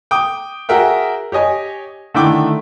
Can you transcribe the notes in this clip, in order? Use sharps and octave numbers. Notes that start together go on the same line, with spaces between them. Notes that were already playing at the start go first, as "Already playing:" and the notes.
G5 D6 D#6
F#4 G#4 A#4 E5 G5
G4 C#5 D#5 G#5
D3 D#3 A3 E4 G5 D6